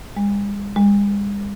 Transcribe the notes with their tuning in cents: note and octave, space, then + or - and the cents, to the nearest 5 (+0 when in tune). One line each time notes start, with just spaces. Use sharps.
G#3 -45
G#3 -45